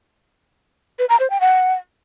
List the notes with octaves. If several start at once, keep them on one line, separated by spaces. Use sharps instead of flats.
B4
A#5
C5
G5
F#5